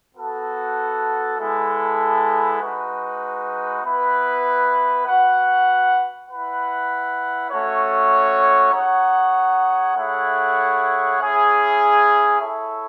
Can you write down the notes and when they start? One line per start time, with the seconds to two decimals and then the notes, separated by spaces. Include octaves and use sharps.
0.15 B3 F#4 A4
1.38 G#3 B3 E4 A4
2.60 G#3 D#4 F#4 B4
3.83 B3 E4 B4
5.06 F#4 B4 F#5
6.27 E4 B4 F#5
7.50 A3 C#4 F#4 C#5
8.73 D#4 G#4 C#5 F#5
9.95 A3 E4 G#4 C#5 F#5
11.18 C#4 E4 G#4
12.40 E4 A4 C#5 E5